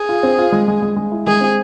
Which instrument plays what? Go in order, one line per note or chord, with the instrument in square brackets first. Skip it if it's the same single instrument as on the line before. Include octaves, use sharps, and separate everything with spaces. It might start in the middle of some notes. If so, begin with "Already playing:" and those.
Already playing: [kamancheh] G#4
[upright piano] F4
C4
F4
G#3
G#3
G#3
G#3
E4
[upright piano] G#3 [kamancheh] G#4
[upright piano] C4